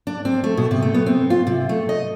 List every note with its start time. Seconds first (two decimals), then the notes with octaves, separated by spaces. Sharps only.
0.07 D4
0.25 C4
0.44 A3
0.57 B2
0.71 C3
0.82 A3
0.94 B3
1.06 C4
1.30 F4
1.47 C3
1.69 A3
1.89 D#5